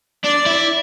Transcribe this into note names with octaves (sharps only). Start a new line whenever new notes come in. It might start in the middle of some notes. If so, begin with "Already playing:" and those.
D4 D5
E4